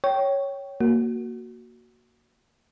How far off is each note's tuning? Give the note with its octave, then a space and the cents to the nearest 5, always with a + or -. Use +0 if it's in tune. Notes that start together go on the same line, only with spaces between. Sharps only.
C#5 +0 G5 -15
A#3 +0 F#4 +0